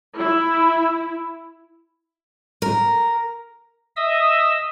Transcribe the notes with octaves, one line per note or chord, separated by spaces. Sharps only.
E4
A#4
D#5 E5 D#6 E6